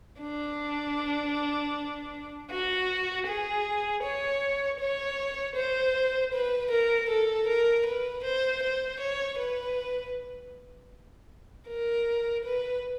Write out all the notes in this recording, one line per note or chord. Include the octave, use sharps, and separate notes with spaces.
D4
F#4
G#4
C#5
C#5
C5
B4
A#4
A4
A#4
B4
C5
C5
C#5
B4
A#4
B4